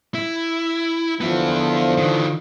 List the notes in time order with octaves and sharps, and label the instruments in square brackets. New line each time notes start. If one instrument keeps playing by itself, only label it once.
[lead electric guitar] E4
[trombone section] D3 F3 [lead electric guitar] B3 E4
[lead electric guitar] D#3 E3